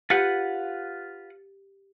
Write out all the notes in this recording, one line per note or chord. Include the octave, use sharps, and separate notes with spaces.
F4 G4 B4 F#5